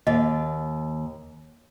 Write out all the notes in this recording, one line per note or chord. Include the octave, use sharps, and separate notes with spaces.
D#2 D#5